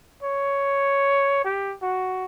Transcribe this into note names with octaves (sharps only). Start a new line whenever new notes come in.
C#5
G4
F#4